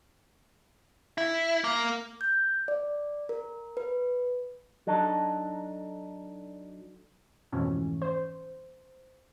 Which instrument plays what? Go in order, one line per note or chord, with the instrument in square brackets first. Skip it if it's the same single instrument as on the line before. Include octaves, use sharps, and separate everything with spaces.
[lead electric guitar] E4
A#3
[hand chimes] G6
D5
A#4
B4
[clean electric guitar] F#3 D4 D#4 A4
[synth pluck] F2 G#2 B2 E3 A3 C#4
C5